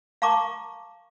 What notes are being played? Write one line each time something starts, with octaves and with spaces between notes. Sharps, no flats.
F5 A5 A#5 C#6 D6